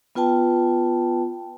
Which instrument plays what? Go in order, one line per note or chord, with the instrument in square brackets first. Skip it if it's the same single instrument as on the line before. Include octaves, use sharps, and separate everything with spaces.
[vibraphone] B3 F4 B4 G5 A5